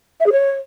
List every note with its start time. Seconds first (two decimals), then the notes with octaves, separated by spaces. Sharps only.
0.20 E5
0.26 G#4
0.32 C#5